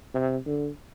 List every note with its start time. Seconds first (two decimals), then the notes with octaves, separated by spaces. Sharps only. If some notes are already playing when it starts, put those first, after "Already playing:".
0.14 C3
0.46 D3